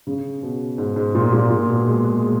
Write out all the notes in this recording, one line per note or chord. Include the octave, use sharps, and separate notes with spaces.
C#3
B2
G#2
G#2
A#2
A#2
A#2
B2
G#3
G#3
G#3